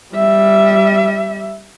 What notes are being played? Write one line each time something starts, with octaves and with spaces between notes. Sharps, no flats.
G3 E5